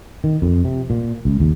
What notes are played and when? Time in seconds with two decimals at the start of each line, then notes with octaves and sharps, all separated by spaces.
0.24 D#3
0.42 F2
0.65 C3
0.90 A#2
1.25 C#2
1.40 D#2